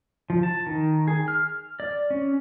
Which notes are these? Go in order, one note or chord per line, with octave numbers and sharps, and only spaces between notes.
F3
A5
D#3
G#4
F6
D5
C#4